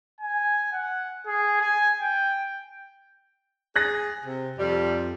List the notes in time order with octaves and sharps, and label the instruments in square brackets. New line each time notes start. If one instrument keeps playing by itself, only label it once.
[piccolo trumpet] G#5
F#5
G#4
G#5
G5
[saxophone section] G#4 [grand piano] F#6 A6 A#6
[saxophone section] C3
[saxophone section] F2 [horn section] C3 G3